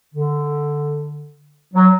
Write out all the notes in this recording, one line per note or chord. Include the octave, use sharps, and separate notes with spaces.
D3
F#3